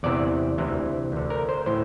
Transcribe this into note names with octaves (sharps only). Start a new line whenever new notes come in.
E2 C3 E3 D5
D2 C3 E3
D2 D3
A#4
C5
A2 E3 C5